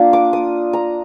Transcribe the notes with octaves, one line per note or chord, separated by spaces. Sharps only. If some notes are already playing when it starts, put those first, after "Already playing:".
Already playing: A#3 D4 F4
D6
D#6
A#5